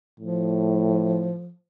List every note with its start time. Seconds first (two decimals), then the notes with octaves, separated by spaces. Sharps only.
0.20 A2 F3